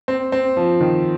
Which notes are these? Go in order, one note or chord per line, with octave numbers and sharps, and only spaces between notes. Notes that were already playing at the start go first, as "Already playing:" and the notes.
C4
C4
F3
D#3